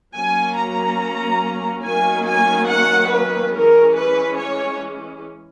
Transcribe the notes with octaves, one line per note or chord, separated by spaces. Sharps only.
F#3 A#3 C#4 G#5
A#5
D#3 F#3 A#3 C#4 G#5
G#5
F#5
B4
E3 G#3 C#4 A#4
B4
C#5